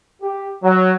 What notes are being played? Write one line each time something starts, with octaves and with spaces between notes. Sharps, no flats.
G4
F#3